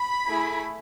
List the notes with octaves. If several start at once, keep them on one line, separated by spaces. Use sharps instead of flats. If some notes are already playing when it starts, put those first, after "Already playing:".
Already playing: B5
A3 E4 G#4